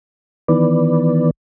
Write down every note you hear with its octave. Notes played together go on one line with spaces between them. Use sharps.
D#3 E3 B3 B4 D5